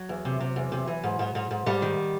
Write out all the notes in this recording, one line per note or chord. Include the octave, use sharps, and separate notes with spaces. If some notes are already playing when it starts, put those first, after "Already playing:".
Already playing: F#3
E2
C3
C3
E2
C3
E3
G#2
G#2
G#2
G#2
G#2 G3
D#3